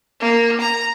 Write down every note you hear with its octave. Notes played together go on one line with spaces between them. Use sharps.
A#3
A#5